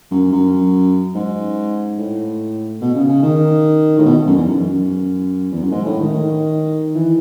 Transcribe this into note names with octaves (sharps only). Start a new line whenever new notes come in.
F#2
F#2
G#2
A2
B2
C#3
C#3
D#3
A2
B2
F#2
E2
F#2
E2
F#2
G#2
A2
D#3
D#3
E3